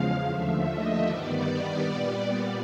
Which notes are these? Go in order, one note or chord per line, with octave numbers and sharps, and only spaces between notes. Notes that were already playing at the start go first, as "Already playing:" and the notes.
Already playing: E2 C#3 F3 G#3 F5
D#2 D3 F3 A3 E5
D#5
G2 D#3 G3 B3 D5
A#2 G3 B3